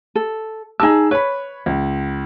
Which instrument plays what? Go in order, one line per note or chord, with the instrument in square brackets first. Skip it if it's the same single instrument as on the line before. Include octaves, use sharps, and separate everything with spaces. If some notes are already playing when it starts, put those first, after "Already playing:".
[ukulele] A4
[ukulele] D#4 A#4 A5 [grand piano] G#4 E6
[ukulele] B4 [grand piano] C#5 B5
[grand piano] C#2